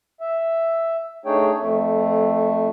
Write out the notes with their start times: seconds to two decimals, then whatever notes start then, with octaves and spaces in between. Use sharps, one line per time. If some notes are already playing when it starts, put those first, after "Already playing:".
0.20 E5
1.25 A3 D4 D#4 G#4 C#5 G5
1.57 F2 A3